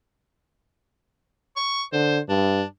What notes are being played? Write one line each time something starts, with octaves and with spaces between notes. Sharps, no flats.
C#6
D3 C5
G2 D4